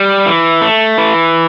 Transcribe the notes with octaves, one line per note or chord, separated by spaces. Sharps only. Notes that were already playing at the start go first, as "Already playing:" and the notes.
Already playing: G3
E3
A3
E3